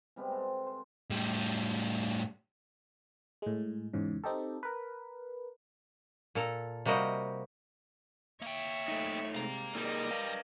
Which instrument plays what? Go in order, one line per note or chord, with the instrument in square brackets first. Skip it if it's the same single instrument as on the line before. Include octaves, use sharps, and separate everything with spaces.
[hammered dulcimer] C3 G3 G#3 B3
A4 C5 F#5 A#5
C5
[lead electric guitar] A2 G3
[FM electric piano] A2 G#3
E2 G#2 C#3
C4 D#4 G4 A4
A#4 B4
[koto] A#2 A4 A#5
C3 G3 A#3 F#4 D#5
[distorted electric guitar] A#3 G5 [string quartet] C#5 E5
[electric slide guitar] A3 D#4
[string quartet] G#2 C3 G3 [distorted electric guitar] F5 A#5
[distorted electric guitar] G3 [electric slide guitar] A#3 D#4 G#4 [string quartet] A#4 D5 D#5
[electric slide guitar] B4 F5